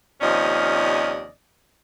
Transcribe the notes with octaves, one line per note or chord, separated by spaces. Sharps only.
D#2 C3 F3 C#4 D5 D#5